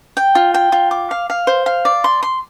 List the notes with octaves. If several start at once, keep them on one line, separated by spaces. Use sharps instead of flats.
G5
F4
G5
F4
D6
F5
F5
C5
F5
D5
C6
C6